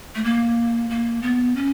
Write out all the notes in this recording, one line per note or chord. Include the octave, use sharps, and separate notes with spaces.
A3
A#3
A#3
B3
C#4